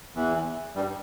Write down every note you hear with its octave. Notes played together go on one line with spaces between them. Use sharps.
E2 E3
G2 G3